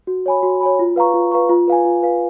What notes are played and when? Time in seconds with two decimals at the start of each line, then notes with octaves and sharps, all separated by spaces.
0.07 F#4
0.26 C#5 G#5 B5
0.43 F#4
0.61 C#5 G#5 B5
0.79 F4
0.96 B4 F5 A#5 C#6
1.14 F4
1.32 B4 F5 A#5 C#6
1.49 F4
1.68 B4 F5 G#5
1.85 F4
2.03 B4 F5 G#5